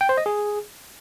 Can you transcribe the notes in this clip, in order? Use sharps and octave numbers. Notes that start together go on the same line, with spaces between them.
G5
C5
D#5
G#4